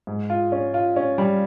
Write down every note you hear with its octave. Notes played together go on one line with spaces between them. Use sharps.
G#2
F4
C#4
F4
C#4
G3